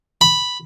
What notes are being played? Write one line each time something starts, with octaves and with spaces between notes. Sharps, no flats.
B5